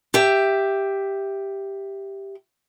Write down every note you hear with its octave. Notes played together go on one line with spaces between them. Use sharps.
G4 E5